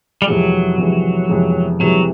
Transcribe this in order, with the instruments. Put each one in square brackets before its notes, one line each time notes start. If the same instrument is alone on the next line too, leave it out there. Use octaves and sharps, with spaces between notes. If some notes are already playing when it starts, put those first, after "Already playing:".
[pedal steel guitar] G3
[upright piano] F2 C3 E3 G#3 [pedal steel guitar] F#3
[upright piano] F2 C3 E3 G#3
F2 C3 E3 G#3
[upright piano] F2 C3 E3 G#3 [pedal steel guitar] F#3